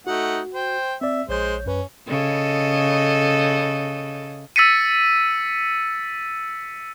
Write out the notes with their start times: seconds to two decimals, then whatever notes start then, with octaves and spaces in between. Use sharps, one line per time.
0.07 A3 D#4 F#4 F#5
0.54 C5 G5
1.01 C4 D5 E5
1.29 A#1 G#3 C5 C#5 G6
1.66 F#2 C#4 B4
2.09 C#3 A4 D#5
4.56 E6 A6 B6 C#7 D#7